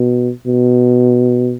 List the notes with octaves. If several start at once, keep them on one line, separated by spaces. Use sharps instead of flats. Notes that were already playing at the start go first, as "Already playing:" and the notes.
Already playing: B2
B2